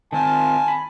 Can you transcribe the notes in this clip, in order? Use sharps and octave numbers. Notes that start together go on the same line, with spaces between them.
D#3 C4 F4 G#5 A5
B5